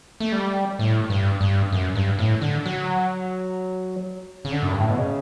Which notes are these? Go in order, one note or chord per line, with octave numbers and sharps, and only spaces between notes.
A3
G3
A2
G2
G2
F#2
G2
A2
D3
F#3
C#3
D3
F#2
G2
A2
B2
C#3